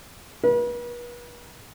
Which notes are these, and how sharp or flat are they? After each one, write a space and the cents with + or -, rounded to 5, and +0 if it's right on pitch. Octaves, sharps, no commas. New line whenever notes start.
B4 -40